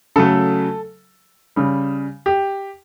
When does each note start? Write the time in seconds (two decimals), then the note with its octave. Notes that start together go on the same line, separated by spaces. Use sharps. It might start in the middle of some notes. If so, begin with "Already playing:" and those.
0.16 C#3 F#3 A3 A4
1.56 C#3 G3
2.26 G4